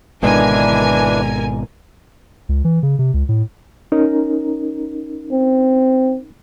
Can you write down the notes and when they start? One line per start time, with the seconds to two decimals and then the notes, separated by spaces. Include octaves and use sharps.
0.23 G#1 B2 D3 E3 G#3 D4 A#4 G#5
2.49 C#2
2.65 E3
2.83 C#3
2.99 C3
3.14 C#2
3.29 A2
3.92 C#4 D#4 A#4
5.32 C4